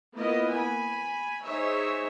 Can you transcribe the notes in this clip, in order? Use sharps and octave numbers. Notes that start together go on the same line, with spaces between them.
A#3 B3 E4 F4 D#5
G#5 B5
D#4 G#4 C5 C#5 E5